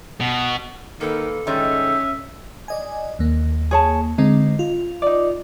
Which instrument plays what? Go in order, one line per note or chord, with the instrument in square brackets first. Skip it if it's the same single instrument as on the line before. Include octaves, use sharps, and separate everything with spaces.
[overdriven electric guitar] B2
[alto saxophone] D#3 [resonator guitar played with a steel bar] A#3 B4 [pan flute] A4
[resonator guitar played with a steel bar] D#3 G3 G#3 [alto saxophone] C#4 [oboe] E5
[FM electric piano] D5 D#5 G#5
D#2 A#3
[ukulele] G#4 C#5 A5
[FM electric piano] D3 G#3 C4 [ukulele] D#4
[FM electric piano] F4
[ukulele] D#4 D5